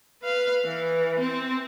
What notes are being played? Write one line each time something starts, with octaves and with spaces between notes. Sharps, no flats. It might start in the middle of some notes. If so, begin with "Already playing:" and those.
B4 F5
E3
C4